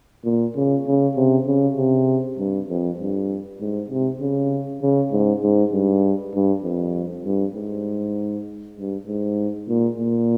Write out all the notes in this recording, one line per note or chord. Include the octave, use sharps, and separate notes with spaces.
A#2
C#3
C#3
C3
C#3
C3
G2
F2
G2
G#2
C3
C#3
C#3
G#2
G#2
G2
G2
F2
G2
G#2
G2
G#2
A#2
A#2